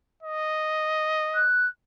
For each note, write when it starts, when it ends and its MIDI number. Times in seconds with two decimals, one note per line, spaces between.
0.23 1.48 75
1.35 1.66 90